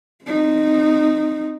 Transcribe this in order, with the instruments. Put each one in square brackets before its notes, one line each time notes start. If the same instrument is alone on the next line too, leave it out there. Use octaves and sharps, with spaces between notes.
[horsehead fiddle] C4 D#4